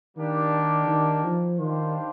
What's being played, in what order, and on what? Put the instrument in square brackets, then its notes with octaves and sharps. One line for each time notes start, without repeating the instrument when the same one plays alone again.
[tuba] D#3 [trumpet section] G3 A#3 D4 G4
[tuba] D#3
F3
[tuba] D#3 [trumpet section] G3 D4 G4 C5 F5